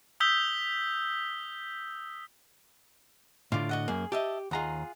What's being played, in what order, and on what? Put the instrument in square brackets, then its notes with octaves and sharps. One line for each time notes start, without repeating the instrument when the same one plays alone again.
[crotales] D#6 E6 G6 B6 G7
[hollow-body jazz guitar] A2 D3 [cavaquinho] F4 D6
[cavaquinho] F#4 D#5 F#5
[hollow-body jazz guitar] F#2 A#3 [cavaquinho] G#4
[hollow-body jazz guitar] G4 [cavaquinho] D#5 E5 A5
[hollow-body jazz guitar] D#2 A#5 [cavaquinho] F4 G#4 F#5